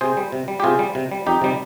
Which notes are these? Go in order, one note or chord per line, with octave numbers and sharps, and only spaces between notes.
C3 G#4 C5
G3
C3
G3
G4
C3 F4 G#4
G3
C3
G3
F2 D#4 G4
C3 G3